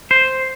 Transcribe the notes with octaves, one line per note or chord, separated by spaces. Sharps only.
C5